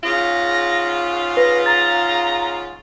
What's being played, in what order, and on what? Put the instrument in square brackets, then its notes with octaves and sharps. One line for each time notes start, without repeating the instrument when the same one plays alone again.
[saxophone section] G#2 C#3 F4 [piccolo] A#6
[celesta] B4 [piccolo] A#6
[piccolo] A#5 [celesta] A6